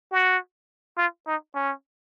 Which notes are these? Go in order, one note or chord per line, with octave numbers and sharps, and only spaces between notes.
F#4
F4
D#4
C#4